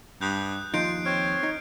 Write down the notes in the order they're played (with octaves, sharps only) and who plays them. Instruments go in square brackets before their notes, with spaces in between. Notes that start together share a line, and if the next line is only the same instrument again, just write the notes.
[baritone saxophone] G2 [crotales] D#6 F#6 G6
[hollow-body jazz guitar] D#2 F3 D#4 [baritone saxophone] F4 [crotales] G6 C7 D7
[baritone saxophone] C4 [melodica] C#5 [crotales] F6
[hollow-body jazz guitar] D#4